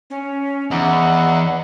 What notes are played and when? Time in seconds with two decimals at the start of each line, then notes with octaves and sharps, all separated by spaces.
0.10 C#4
0.71 E2 D#4 D#5 E5 F#5